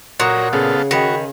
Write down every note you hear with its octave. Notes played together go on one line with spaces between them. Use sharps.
A#2 F#4 A#4 C#5 F#5 D#6 F#6
C#3 B3 A4 F5
D#3 F#4 G#4 G5 B5 B6